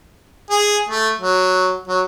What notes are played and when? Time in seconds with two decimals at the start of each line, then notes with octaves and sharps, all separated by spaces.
0.50 G#4
0.89 A3
1.19 F#3
1.88 F#3